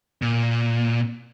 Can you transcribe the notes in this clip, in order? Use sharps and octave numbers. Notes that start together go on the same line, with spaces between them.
A#2